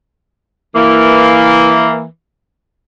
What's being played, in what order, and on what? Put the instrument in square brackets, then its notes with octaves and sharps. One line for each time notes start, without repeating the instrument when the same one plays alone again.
[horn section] E3 A#3